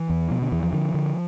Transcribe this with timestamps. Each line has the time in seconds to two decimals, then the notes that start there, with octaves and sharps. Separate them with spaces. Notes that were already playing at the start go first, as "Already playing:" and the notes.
Already playing: E3
0.10 E2
0.31 B2 F3
0.42 D3
0.52 E2 E3
0.63 F3
0.73 D3
0.94 D3